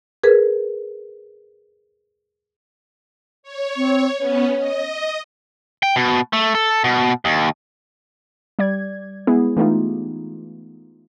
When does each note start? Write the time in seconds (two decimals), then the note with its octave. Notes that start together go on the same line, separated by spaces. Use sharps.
0.24 G#4 A#4 B4
3.43 C#5
3.76 C4
4.18 B3 C#4 C#5
4.57 D#5
5.83 G5
5.96 B2
6.33 A3
6.55 A4
6.84 B2
7.25 D#2
8.59 G3 D5 G#6
9.27 G#3 B3 E4 G#4
9.57 E3 A3 B3 D#4 F4 G4